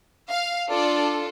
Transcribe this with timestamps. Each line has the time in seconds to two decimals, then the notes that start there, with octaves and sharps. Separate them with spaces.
0.30 F5
0.70 D4 F4 A4 D5